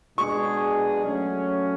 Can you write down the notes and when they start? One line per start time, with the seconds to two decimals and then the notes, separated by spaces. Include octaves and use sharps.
0.18 B2 G#3 D4 G#4 C#6
1.04 F#3 A3 C#4